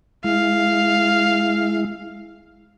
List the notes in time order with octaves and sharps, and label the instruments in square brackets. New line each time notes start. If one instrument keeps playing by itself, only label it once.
[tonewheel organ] G#3 E4 [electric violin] F5